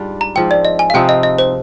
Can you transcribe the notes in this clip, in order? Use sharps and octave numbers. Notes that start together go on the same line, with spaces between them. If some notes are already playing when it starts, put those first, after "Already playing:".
Already playing: G#2 G3 D4 F4
A#5
G#2 F3 C4 G5
D5
D#5
G#5
F5
C3 F3 C4 D#4 G5
D#5
D#5
C5